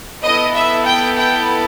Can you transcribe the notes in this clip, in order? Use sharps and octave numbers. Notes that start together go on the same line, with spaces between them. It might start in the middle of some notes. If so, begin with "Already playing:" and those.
B3 E4 A4 D#5
E5
G5
G5